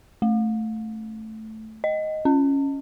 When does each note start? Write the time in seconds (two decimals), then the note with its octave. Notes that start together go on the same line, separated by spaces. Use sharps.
0.22 A3
1.84 D#5
2.25 C#4